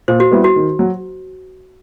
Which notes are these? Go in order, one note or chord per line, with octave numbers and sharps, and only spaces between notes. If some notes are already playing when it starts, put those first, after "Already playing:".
A#2 C5
F#4
G3 B3 E4 G4
F#4
D#3
F#3